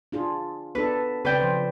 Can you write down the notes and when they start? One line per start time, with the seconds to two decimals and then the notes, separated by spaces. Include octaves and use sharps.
0.12 D4 F4 G#4
0.75 B3 D4 A4 B4
1.25 C#3 C4 B4 D5 G5
1.40 F3 C5